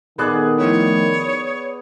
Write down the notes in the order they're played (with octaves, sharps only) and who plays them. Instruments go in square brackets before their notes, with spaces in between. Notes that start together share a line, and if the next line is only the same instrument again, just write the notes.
[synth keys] A#2 A4 F#6 [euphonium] D#3 [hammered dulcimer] B3 G#4 D5
[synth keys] F3 A3 E4 [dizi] C#5
[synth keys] D#6